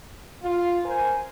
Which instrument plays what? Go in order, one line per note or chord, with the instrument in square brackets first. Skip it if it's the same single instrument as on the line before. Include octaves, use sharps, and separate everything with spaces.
[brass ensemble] F4
A#4 C5 G#5